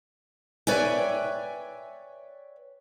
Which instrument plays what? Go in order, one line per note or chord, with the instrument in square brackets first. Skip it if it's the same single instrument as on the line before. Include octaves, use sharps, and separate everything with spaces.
[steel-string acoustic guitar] B4 C#5 D5 E5 G5 G#5